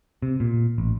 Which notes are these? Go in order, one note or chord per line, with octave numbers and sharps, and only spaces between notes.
C3
A#2
A1